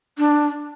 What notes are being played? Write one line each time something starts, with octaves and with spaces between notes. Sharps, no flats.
D4